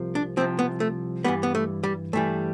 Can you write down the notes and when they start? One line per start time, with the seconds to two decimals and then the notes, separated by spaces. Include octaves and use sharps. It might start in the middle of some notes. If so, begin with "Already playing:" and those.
Already playing: C2 C3 F3
0.15 D4
0.37 C2 C3 F3 C4
0.59 B3
0.80 A3
1.24 G2 E3 G3 B3
1.43 B3
1.55 A3
1.83 G3
2.13 G2 E3 G3 A3